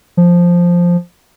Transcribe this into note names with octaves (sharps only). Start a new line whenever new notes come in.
F3